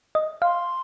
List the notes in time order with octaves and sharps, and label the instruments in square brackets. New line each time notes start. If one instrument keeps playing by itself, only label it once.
[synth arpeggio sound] D#5
[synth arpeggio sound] F5 [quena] C6